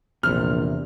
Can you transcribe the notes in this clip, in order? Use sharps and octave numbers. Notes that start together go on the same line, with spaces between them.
A#1 E2 C3 F6